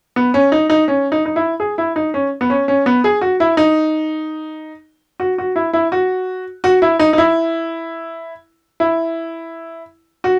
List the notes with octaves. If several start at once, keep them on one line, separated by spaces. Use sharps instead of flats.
B3
C#4
D#4
D#4
C#4
D#4
D#4
E4
G#4
E4
D#4
C#4
B3
C#4
C#4
B3
G#4
F#4
E4
D#4
F#4
F#4
E4
E4
F#4
F#4
E4
D#4
D#4
E4
E4
F#4